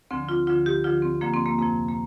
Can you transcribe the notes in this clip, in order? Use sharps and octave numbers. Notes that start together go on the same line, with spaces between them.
D2 D3 F3 C4
F4
D2 D3 F3 F4
G4
D2 D3 F3 F4
C4
D2 D3 F3 A#3
C4
A#3
F2 C3 F3 A#3
A#3